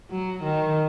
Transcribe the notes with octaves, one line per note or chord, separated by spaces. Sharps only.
F#3
D#3